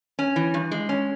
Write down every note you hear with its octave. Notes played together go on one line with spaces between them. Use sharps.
C#4
E3
G2
G#3
C#4